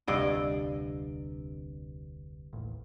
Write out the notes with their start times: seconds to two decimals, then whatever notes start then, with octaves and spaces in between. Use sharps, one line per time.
0.08 F1 D2 G2 C3 D5 D#5
2.53 D#1 A1